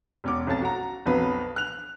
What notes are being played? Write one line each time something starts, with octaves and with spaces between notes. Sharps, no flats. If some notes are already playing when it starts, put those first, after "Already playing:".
E1 C#4 D6
B1 F2 C#4 A5 A6
F#4 A#5
B1 F2 F#3 B4
F#6 F7